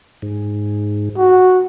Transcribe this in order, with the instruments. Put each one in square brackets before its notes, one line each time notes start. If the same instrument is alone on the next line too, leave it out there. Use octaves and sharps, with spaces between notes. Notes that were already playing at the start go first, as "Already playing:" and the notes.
[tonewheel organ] G#2
[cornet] F#4